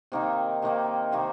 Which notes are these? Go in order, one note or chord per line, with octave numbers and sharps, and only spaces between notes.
C3 D#3 A#3 D#4
C3 D#3 A#3 D#4
C3 D#3 A#3 D#4